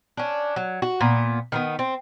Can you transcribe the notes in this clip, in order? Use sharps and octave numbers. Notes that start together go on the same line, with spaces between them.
C#4 D4
F#3
F#4
A#2 B3
D#3 A#3 B3
C4